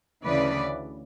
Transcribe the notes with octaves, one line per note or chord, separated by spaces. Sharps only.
D2 C#3 E3 B4 D5